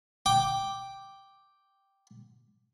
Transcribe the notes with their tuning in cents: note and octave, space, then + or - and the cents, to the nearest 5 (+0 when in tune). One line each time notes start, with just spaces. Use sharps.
G5 +0 D6 +0